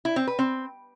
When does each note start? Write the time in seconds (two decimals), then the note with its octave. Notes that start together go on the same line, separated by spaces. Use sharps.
0.05 E4
0.16 C4
0.27 B4
0.39 C4